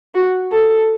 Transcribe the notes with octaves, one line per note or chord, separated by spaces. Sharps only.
F#4
A4